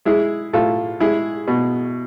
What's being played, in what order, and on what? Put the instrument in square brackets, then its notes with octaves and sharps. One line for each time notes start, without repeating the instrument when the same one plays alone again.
[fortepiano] G#3 E4 G#4
A2 F4 A4
G#3 E4 G#4
B2